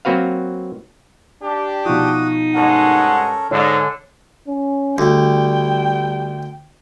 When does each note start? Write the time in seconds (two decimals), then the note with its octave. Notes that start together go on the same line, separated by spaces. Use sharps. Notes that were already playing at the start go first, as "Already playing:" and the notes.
0.05 F#3 A#3 C4 F#4 B4 F5
1.42 D4 G4
1.85 B2 F3 D#4 F#4 D#6
2.55 G2 G#3 C#4 A4 A#4 F#5
3.51 G#2 D3 C#5 D5
4.48 C#4
4.98 D2 G3 G5